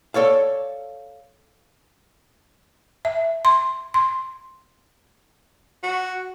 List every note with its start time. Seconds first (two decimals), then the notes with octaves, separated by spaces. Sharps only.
0.14 A4 C#5 D5 F5
3.05 E5
3.45 C6
3.94 C6
5.83 F#4